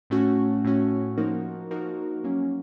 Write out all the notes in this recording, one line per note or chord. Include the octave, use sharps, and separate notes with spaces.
A2 A3 C#4 F#4
A2 A3 C#4 F#4
F3 A#3 D#4 F#4 A#4
F3 A#3 D#4 F#4 A#4
F#3 A#3 C#4